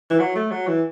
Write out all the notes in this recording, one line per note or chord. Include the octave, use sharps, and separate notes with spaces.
E3
F#3
A3
F#3
E3